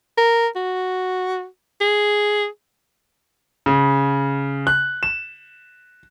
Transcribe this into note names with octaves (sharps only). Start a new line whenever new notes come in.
A#4
F#4
G#4
C#3
F#6
E7